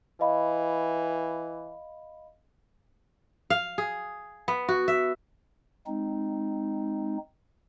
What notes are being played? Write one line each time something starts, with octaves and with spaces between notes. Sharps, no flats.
E3 D#5 F5 B5
F5
G#4
B3
F#4
E5
G#3 C4 D#4